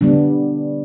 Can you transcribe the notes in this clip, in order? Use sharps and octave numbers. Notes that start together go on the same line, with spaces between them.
D3 G3 B3 D4